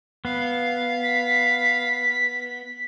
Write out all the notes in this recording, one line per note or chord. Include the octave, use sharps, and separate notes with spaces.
B3 F5
B6